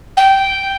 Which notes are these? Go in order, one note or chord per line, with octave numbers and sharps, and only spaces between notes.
G5